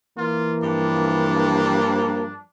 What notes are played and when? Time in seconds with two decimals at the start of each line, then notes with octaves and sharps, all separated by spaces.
0.18 E3 A#3 F4
0.63 G2 F3 D4